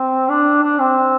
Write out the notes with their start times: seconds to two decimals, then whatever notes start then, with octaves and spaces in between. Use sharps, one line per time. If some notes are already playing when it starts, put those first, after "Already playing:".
Already playing: C4
0.29 D4
0.62 D4
0.79 C4